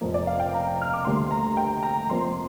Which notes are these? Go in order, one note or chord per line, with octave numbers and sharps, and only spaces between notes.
F1 F2 F3 A#3
D5
F5
G5
A#5
F6
D6
D2 D3 G3 A#3 C6
A#5
G5
A#5
F1 F2 F3 A#3 C6